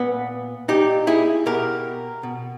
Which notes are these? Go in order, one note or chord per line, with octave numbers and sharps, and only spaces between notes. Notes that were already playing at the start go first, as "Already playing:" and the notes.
Already playing: A#2 B3
A#2 D#4 G4
E4 G#4
B2 G4 A#4
B2